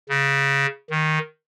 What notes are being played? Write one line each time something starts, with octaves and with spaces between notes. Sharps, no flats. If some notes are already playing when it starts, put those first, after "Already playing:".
C#3
D#3